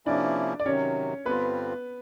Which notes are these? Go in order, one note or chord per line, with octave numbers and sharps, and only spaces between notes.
C3 F3 A#3 C#4 D4 E4 D5
D5
C3 D#3 F#3 C#4 C#5
G2 D3 G3 B3 C4 F4 B4